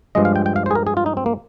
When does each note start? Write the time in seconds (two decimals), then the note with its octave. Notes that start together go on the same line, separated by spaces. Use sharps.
0.15 G2 F3 G#3 D#5
0.25 F5
0.36 G5
0.46 G5
0.56 F5
0.66 C5
0.71 G#4
0.75 A#4
0.87 G#4
0.97 F4
1.06 D#4
1.17 C4
1.26 A#3